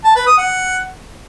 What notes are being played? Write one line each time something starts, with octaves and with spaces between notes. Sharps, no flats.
A5
B4
D#6
F#5